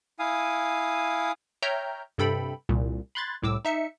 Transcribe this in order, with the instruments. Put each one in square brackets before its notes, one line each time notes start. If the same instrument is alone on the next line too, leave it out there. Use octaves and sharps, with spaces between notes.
[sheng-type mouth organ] E4 F5 G#5 D#6
[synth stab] C#5 E5 G5 A#5 F6 G6
G2 C3 A4 G5 B5
C2 A#2
B5 C6 F#6 G#6 A6
C2 A2 D6 E6
D#4 E5 C#7